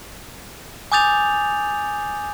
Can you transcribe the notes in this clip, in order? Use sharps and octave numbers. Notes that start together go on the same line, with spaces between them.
G#5 D6 D#6 G6 A6 F7